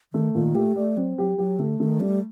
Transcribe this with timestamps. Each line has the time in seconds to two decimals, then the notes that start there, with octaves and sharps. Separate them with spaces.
0.13 D#3 A3
0.34 A#2 D#3
0.55 A3 G4
0.76 A3 D5
0.97 F#3 C4
1.18 F#3 G4
1.38 F#3 G4
1.59 D3 A3
1.80 D#3 A3
2.00 G3 A3